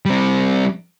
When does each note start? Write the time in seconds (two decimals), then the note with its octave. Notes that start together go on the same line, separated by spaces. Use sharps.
0.05 G3 C4